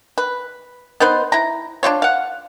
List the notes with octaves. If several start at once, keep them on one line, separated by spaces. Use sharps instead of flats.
B4
B3 D#4 B4 C5
E4 A#5
D4 E4 F4 C#5
F5 F#5